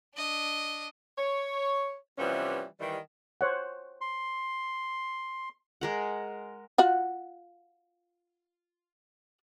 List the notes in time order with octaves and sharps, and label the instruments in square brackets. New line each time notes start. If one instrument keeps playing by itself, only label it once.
[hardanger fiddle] D4 D#5
[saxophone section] C#5
C3 E3 F3 G3 B3 C#4
D#3 E3 G3
[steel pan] C5 C#5 F#5
[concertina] C6
[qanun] G#3 A#4 F#5
[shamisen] F4 F#4 F#5